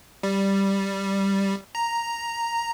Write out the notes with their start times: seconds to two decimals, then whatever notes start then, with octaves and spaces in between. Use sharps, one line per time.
0.23 G3
1.75 A#5